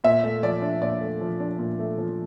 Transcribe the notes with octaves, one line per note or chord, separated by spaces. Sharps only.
A#2 E5
A3
F3 D5
D4
A#2 D5
A3
F3
D4
A#2
A3
F3